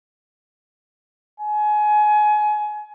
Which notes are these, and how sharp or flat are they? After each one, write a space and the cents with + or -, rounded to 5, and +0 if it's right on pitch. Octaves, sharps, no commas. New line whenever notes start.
G#5 +25